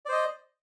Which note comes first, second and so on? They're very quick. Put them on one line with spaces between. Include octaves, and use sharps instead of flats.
D5 C5 D#5